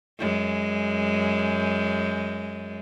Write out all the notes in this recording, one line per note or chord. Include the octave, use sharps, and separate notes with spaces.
F#2 G#3